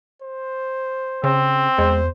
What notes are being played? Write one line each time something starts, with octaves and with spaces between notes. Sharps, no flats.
C5
C#3 C4
E2 G#3 C5